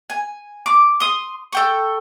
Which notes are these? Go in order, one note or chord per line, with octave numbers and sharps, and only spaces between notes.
G#5
D6
C6 D#6
A4 G5 C#6